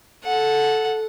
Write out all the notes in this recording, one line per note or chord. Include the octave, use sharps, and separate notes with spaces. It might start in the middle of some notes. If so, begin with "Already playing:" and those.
A4 F#5